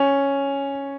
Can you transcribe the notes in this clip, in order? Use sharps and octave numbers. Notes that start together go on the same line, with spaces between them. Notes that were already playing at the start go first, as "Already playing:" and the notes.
Already playing: C#4